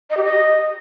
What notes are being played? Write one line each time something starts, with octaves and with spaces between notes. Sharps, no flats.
D#5
G4
D#5